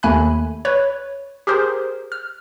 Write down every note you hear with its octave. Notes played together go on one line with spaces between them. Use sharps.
D#2 A3 G#5 B5 F#6
B4 C#5
G4 G#4 A#4 C5
F6